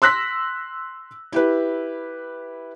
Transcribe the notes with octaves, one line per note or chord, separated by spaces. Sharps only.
C6 E6 F#6 A#6 B6
E4 G4 B4